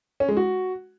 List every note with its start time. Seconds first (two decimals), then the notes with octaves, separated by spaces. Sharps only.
0.20 C#4
0.29 G#3
0.37 F#4